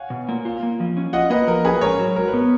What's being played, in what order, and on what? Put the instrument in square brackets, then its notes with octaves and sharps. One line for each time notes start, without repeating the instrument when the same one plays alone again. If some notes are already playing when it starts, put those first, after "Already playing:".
Already playing: [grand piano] C#5 F5 F#5 G#5
[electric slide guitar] B2
A#3
F4
A#3
F3
C#4
[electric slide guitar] F4 [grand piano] D#5 F#5
[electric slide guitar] A#3 [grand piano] B4 D#5
[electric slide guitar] F3 [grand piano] A#4
[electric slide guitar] C#4 [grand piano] G#4 B4
[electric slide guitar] G#2 [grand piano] A#4 C#5
[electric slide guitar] F#3
[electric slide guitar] G#2 [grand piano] A#4
[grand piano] B4
[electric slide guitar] B3
[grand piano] A#4